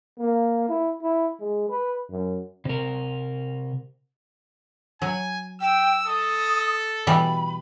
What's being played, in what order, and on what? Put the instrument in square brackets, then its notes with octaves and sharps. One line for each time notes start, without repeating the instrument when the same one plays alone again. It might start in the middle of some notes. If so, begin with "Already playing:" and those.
[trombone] A#3
E4
E4
G#3
B4
F#2
[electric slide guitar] C3 A#4
[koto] F#3 [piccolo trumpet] G#5
[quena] G5 [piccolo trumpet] E6
[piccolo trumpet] A4 [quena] D#6
[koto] B2 E3 G3 [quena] B5